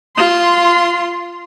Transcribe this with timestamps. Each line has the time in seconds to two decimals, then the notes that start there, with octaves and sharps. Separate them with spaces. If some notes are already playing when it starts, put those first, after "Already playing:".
0.16 F4 C6